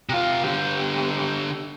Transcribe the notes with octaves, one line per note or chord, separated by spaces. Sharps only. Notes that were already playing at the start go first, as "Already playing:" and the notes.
C3 F4
D3 G4